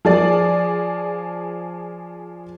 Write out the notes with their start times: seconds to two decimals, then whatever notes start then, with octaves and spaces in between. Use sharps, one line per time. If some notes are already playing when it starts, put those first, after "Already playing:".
0.05 F3 G#4 D5